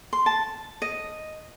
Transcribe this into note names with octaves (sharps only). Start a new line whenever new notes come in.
C6
A5
D#5